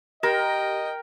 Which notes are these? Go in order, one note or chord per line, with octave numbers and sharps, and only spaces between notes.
G4 A#4 D#5 G5 A#6